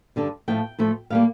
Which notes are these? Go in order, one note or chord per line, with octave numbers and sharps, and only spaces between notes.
G2 D3 G3
A2 F3 A3 G5
A2 F3 A3
A2 G3 A#3 F5